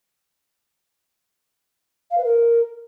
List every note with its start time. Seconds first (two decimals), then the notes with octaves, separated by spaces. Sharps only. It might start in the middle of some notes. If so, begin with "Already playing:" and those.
2.10 F5
2.17 B4
2.24 A#4